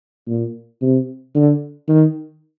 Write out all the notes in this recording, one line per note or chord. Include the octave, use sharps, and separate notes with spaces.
A#2
C3
D3
D#3